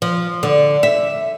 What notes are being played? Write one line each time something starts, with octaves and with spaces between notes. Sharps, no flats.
F3
D3
E5